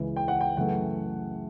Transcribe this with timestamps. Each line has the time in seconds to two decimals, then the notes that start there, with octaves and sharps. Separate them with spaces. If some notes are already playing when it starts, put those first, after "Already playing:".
Already playing: C#2 C#3 E3
0.16 G5
0.28 F#5
0.41 G5
0.56 F#2 C#3 E3 A3 F#5